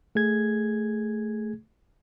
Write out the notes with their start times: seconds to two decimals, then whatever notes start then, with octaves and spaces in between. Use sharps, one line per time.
0.15 A3 G#4 G#6